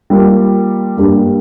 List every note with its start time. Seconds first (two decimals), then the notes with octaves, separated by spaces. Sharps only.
0.10 G3 A#3 F4 A#4
0.97 G2 G3 A#3 D4 G4